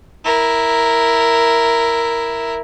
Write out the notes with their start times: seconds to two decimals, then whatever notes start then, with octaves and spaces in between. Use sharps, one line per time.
0.25 E4 A#4